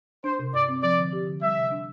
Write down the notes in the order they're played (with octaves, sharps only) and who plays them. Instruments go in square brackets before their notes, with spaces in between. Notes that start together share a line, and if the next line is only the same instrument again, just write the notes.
[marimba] D4 [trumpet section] C5
[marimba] C3
[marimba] G2 [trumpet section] D5
[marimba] C4
[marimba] F3 [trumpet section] D5
[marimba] D3
G4
D3
[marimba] G3 [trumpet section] E5
[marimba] C3
D4